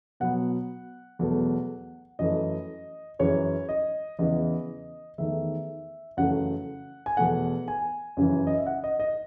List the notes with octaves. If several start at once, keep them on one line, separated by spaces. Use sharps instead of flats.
B2 F#3 B3 F#5
E2 B2 F#3 A3
F#2 E3 A3 D#5
F#2 E3 G#3 C#5
D#5
E2 C#3 E3 D#5
E2 D#3 A3 E5
F#2 C#3 E3 A3 F#5
G#5
E2 B2 A3 F#5
G#5
F#2 C#3 E3
D#5
E5
F#5
D#5
D#5